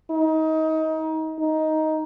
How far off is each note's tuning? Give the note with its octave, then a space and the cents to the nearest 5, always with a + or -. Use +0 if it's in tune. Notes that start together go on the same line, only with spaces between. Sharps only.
D#4 +25
D#4 +10